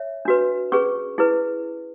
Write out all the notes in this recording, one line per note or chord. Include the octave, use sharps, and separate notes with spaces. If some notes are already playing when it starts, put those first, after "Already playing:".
Already playing: C#5 E5
D4 F#4 B4
C#4 G#4 B4 C#6
E4 G#4 B4